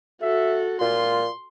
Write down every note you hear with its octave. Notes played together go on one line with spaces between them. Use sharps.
F#4 A4 E5
A#2 F4 C6